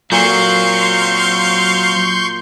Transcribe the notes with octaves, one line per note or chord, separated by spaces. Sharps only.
A#2 F#3 C4 F5 C6 C#6 G6